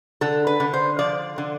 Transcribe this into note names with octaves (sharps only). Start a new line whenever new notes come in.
D3 A4
B4
D3
C5
F3 D5
D3